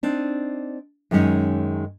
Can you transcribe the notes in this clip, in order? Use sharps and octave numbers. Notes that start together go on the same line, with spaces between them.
C4 D4 D#4
F#2 D#3 G#3 C#4 D#4